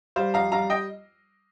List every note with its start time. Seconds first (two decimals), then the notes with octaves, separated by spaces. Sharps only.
0.16 G3 C5 F5
0.34 F2 F5 A#5
0.52 G3 F5 A#5
0.70 D#5 G5